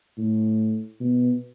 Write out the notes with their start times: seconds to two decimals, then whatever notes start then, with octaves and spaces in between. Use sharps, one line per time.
0.18 A2
1.01 B2